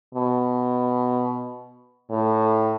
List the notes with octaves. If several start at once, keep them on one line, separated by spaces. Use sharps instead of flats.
B2
A2